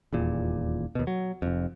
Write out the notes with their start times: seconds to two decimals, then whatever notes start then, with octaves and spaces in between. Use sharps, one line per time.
0.13 D#1 E2 A#2
0.95 D#2 B2
1.07 F#3
1.42 F1 F2